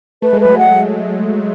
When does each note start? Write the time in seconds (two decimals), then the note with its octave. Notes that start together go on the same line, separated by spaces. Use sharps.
0.22 A3 B4
0.33 G#3
0.40 F#3 A3 B4
0.58 F#5